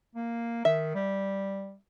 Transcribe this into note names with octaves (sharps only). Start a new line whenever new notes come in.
A#3
D#3 E5
G3